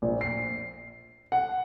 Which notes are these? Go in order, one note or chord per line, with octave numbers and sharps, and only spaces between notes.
A#1
C7
F#5